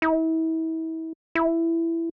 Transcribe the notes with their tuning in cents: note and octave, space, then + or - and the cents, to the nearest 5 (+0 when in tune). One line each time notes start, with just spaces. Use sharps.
E4 -35
E4 +10